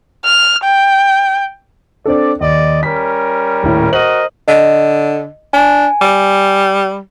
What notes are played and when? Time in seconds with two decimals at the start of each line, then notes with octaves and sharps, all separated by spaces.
0.25 F6
0.64 G5
2.06 C4 D4 A4 D5
2.41 D#2 D5 D#5
2.83 G3 C#4 A#4 B6
3.63 D#1 A2
3.93 F#4 A#4 C5 D#5 F#7
4.48 D3 D#5
5.53 D4 G#5
6.01 G3